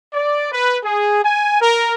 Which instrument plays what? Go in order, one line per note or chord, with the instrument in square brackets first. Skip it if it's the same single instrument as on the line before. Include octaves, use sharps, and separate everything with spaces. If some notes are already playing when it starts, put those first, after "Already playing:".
[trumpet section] D5
B4
G#4
G#5
A#4